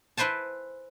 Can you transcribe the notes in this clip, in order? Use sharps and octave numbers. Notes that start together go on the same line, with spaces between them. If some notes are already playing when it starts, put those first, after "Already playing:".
E4 B4 C5 G#5 A5